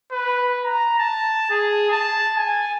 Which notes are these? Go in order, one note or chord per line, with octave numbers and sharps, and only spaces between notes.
B4
A#5
A5
G#4
A5
G#5